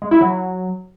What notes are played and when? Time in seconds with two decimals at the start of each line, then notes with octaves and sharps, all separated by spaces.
0.02 G#3
0.11 E4
0.21 F#3